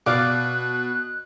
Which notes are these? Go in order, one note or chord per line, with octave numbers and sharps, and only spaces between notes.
B2 D5 F5 D6 F#6